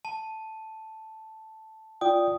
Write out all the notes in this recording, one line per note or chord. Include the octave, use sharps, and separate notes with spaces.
A5
F4 D5 G5 D#6